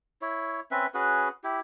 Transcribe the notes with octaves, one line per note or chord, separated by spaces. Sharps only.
E4 C#5
C4 C#4 B4 E5
C#4 F#4 G#4 B4
E4 G4